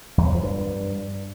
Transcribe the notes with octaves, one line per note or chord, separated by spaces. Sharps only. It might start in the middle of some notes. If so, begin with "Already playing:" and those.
E2
F#3
F3
G2